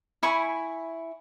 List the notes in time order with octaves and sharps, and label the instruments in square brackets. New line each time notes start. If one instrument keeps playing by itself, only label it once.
[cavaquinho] E4 G#5 B5 C#6